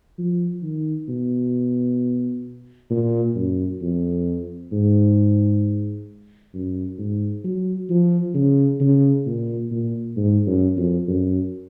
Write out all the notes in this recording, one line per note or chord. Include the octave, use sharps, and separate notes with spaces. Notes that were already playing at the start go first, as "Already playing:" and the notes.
F3
D#3
B2
A#2
F#2
F2
G#2
F#2
G#2
F#3
F3
C#3
C#3
A#2
A#2
G#2
F#2
F2
F#2